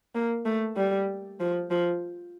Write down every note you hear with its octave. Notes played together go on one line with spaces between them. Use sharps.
A#3
A3
G3
F3
F3